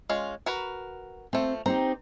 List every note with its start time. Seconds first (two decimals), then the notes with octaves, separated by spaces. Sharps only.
0.09 G#3 C#4 F4
0.46 F#4 A#4 B4
1.33 F3 A3 C4
1.66 C4 D#4 G4 A#5